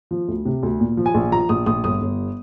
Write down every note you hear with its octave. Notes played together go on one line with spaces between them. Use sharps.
F3
D2
C3
D2
A#2
F3
G#5
A#1
F3 A#5
A#1 D#6
A#1 D#6
G1 D#6
G1